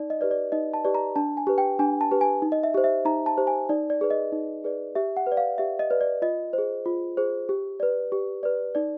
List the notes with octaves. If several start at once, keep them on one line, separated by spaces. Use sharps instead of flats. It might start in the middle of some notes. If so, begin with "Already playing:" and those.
Already playing: D#4 D5
D#5
G4 B4 D5
D5
D#4 D#5
A5
G4 B4 D5
A#5
D4 A5
G#5
G4 B4
G5
D4 G#5
A5
G4 B4
G#5
D#4
D#5
E5
G4 C5
E5
D#4 A#5
A5
G4 C5
G#5
D#4 D5
D5
G#4 B4 D5
D#5
D#4
G#4 B4 D5
G4 E5
F#5
B4
D5
F5
G4 E5
D#5
B4 D5
D5
F4 D#5
C5
G#4
F4
G#4 C5
G4
B4 D5
G4
B4 D5
D#4 D5